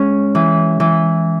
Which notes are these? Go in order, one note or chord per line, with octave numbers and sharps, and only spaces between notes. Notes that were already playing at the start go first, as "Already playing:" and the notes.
Already playing: G#3 C#4
E3
E3